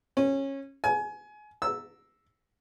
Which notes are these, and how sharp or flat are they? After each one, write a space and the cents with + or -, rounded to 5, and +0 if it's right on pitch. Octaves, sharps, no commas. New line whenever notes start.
C#4 -20
G#5 +25
E6 -5